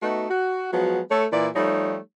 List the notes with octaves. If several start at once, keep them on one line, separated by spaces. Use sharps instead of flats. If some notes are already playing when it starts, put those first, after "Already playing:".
A3 B3 D#4 F#4
F#4
F3 F#3 G#3 B3 F#4
A3 A4 C#5
A#2 E3 E4 D5
F3 G3 A3 D#4 G4 C#5